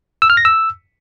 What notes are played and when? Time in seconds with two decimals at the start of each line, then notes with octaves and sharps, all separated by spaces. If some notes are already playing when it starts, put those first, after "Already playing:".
0.22 E6
0.30 F6
0.37 A#6
0.45 E6